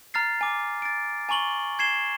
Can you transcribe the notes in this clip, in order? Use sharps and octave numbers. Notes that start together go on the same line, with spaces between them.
A#5 F6 A6 C7
G#5 D6
A6 D7
G#5 A#5 C#6 F#7 G7
G#6 C7 E7 G7